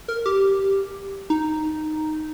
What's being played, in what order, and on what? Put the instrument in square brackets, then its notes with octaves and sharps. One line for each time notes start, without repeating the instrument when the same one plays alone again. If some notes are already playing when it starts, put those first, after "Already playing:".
[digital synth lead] A#4
G4
D#4